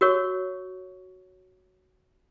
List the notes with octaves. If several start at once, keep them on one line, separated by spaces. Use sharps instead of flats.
F#4 A#4 C#5 C#6